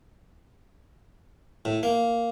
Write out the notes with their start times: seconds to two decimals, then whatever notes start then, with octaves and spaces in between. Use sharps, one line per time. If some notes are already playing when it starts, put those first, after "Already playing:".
1.65 A2
1.83 A#3